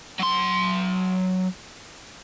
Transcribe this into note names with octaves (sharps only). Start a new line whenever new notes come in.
F#3 C6